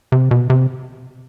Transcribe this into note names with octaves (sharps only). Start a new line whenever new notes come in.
C3
B2
C3